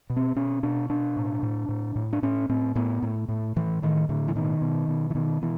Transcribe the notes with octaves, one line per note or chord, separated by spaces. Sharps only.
B2
C4
B2 C#4
B2 D4
B2 D4
A2
A2
A2
A2
D4
A2 C#4
A2 C4
A2 B3
A2
A2
A2 E3
A2 D#3
A2 D3
E3
B2 D#3
B2
B2
E3
B2 D#3
B2 E3